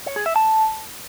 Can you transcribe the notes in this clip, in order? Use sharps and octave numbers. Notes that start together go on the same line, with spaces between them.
C#5
G#4
E5
A5